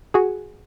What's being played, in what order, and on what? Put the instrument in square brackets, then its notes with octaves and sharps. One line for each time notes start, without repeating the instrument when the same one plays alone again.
[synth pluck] F#4 G#4